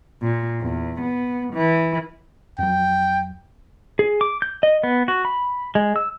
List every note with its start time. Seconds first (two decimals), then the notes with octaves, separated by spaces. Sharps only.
0.23 A#2
0.60 E2
1.01 B3
1.54 E3
2.59 F2 F#3 G5
3.99 G#4
4.21 D6
4.42 G6
4.63 D#5
4.83 B3
5.08 F#4
5.25 B5
5.75 G#3
5.96 E6